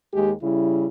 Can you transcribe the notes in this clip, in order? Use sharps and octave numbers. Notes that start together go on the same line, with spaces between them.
D#2 G#3 G4 G#4
C#3 G3 E4